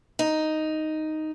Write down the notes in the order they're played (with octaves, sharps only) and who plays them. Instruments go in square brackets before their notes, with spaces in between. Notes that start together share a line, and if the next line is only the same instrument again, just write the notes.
[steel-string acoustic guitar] D#4